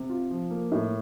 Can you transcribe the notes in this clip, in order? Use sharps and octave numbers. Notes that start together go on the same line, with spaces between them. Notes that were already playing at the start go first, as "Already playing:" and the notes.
Already playing: C3
F4
F3
A#3
A2